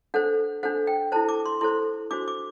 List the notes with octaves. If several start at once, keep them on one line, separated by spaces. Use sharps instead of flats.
D4 A4 C5 F#5
D4 A4 C5 F#5
G5
E4 A4 C5 A5
D6
C6
E4 A4 C5 C6
D4 F#4 C5 D6
D6